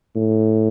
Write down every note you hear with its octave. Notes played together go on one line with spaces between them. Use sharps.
A2